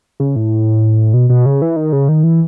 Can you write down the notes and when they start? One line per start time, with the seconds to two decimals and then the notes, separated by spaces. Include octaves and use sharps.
0.20 C#3
0.36 A2
1.14 B2
1.30 B2
1.46 C#3
1.62 E3
1.76 D#3
1.93 C#3
2.09 D#3
2.23 E3